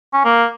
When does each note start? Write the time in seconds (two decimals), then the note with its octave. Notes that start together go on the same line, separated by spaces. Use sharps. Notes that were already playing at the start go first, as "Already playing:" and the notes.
0.13 C#4
0.25 A#3